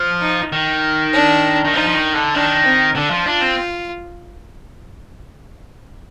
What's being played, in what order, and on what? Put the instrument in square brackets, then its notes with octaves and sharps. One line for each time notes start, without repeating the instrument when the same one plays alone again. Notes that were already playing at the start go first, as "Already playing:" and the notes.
Already playing: [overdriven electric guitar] F3
[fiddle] D#4
[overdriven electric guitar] D#3
[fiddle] D4
[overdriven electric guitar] D#3
[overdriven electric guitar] F3 [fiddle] D#4
[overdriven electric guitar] F3
D#3
D3
[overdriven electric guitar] D#3 [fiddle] D4
[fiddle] C4
[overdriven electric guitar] D3 [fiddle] D4
[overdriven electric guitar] F3
[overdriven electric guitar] D4 [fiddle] F4
[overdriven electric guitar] C4